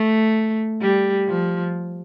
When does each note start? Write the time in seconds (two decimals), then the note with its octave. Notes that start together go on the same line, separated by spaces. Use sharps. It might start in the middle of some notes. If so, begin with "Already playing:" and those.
Already playing: A3
0.81 G3
1.27 F3